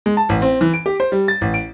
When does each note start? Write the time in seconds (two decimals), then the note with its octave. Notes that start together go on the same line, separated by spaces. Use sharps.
0.06 G#3
0.17 A5
0.29 A1
0.42 C4
0.61 E3
0.74 D7
0.86 G4
1.00 C5
1.12 G3
1.28 A6
1.41 A1
1.54 D7